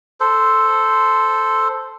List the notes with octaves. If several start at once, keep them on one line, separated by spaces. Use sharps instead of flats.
A4 C5